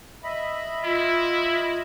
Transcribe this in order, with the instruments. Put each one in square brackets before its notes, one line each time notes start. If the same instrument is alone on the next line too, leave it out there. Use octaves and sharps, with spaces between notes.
[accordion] D#5 E5 B5
[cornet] E4 [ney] F4